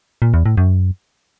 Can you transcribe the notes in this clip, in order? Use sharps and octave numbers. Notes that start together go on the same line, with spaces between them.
A#2
E2
A2
F#2